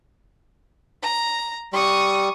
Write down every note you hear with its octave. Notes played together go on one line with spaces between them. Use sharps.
A#5
G3 C#6 D#6